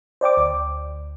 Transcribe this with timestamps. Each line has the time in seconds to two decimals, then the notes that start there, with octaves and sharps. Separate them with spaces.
0.21 C5 D5 G5 D6
0.37 D2